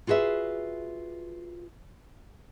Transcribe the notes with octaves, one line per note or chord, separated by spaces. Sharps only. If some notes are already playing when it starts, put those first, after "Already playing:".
F4 F#4 G#4 B4 E5